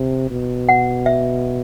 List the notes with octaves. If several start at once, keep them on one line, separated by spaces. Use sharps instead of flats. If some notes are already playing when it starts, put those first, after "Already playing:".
Already playing: C3
B2
F#5
E5